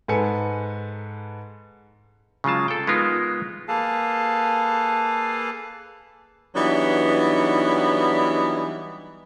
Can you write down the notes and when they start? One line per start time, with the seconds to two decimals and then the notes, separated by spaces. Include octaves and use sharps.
0.08 G#2 A4 B4 G#5 C#7
2.44 C#3 F#3 G#3 F4 A5
2.68 A4 G5
2.87 G#3 B3 D#4 F4 A#4
3.68 A#3 G#4 A4 B4 F5 A5
6.55 E3 F#3 G3 B3 D4 D#4